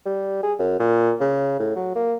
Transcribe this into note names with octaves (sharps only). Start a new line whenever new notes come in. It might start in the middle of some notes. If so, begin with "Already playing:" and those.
G3
G#4
F#2
A#2
C#3
A2
F#3
A#3